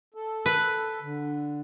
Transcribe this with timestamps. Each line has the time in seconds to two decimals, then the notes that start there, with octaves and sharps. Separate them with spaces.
0.14 A4
0.46 B4
1.01 D3